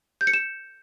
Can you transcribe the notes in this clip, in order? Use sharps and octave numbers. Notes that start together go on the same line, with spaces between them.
G6
C#7
E7